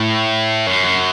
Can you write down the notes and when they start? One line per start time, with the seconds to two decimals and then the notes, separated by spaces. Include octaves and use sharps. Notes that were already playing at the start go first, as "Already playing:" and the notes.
Already playing: A2
0.67 F#2